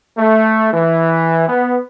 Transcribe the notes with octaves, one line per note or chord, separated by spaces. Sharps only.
A3
E3
B3